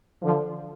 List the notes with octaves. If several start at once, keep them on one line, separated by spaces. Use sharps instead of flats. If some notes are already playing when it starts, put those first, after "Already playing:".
D3 F3